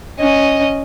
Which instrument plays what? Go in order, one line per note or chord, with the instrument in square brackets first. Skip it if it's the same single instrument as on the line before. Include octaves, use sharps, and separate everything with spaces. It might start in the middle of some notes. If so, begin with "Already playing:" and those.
[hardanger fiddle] C#4 D#5